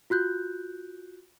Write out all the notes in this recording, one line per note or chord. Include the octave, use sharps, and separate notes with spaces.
F4 F#4 F#6 G6